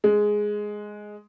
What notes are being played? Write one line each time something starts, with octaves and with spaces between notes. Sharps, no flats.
G#3